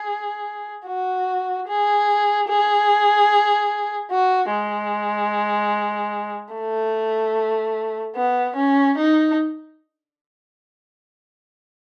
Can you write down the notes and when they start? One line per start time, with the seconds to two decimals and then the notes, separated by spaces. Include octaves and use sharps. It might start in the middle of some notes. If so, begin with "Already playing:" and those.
Already playing: G#4
0.86 F#4
1.67 G#4
2.48 G#4
4.10 F#4
4.51 G#3
6.53 A3
8.16 B3
8.56 C#4
8.97 D#4